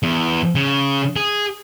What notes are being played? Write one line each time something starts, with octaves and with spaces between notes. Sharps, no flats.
E2
C#3
G#4